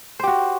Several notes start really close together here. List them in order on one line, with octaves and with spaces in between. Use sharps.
C5 G4 F#4